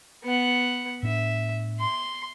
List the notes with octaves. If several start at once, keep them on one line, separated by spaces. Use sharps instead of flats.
B3 F#5
A2 C4 D4 E5
C6